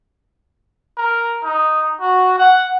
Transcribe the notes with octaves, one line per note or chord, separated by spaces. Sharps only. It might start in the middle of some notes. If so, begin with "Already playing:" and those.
A#4
D#4
F#4
F#5